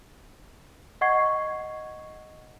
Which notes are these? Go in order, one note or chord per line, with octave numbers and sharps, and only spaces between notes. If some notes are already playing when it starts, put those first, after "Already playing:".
D#5 F#5 C#6 G#6 C7